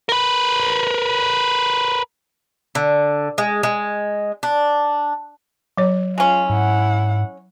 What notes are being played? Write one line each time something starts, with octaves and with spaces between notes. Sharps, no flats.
A#4 B4
D3
G#3
G#3
D4
F#3 C#5
G#3 C#4 F4
G#2 E4 F#5